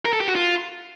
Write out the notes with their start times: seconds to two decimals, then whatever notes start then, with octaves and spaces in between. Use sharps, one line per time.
0.05 A#4
0.13 A4
0.20 G4
0.28 F#4
0.35 F4